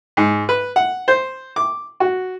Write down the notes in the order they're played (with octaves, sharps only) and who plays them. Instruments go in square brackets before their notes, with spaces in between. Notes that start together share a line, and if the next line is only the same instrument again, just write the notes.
[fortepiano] G#2
B4
F#5
C5
D6
F#4